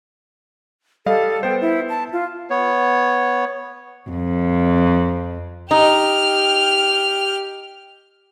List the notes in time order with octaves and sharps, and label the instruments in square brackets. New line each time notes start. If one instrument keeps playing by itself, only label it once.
[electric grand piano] G3 D#5 F5 [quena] A4
[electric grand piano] B3 C5 [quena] G5
[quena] E4
A5
F4
[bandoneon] B3 C#5
[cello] F2
[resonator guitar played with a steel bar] D#4 [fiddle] G4 F6